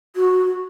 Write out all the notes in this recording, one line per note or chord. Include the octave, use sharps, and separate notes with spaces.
F#4